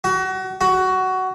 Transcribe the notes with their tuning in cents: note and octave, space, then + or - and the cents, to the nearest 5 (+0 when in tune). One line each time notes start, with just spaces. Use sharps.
F#4 +30
F#4 +15